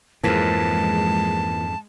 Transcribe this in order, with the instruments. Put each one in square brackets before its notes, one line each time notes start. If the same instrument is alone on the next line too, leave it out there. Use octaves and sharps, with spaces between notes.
[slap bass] F2 G#2 [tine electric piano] E3 F3 A#3 [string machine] G#3 [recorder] A5